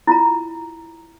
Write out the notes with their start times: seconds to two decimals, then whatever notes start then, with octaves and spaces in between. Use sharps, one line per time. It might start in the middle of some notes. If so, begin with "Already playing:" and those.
0.07 E4 F4 A#5